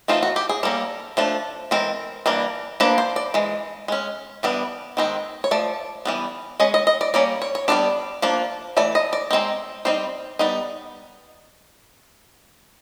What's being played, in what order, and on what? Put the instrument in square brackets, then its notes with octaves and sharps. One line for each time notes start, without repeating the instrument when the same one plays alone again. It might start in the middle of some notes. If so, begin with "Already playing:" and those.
[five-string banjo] E3 A3 C4 D#4 F4
F#4
G4
G#4
G3 A#3 C#4 A4
F3 A3 D4
E3 G#3 C4 A#4
E3 G3 A#3 D4
F3 A#3 D4 B4
C5
D5
E3 G#3
G#3 C#4
E3 G3 B3 D4
D#3 G#3 C4 D#4
C#5
F3 A3 D5
E3 G3 B3
G#3 C#4 D#5
D#5
D#5
D5
G3 A#3 C#4 D5
C#5
C#5
G3 B3 D4 D5
F3 A#3 D4
E3 A3 D5
D#5
D5
G#3 C4 D#4
G3 C4 D#4 C5
G3 B3 D#4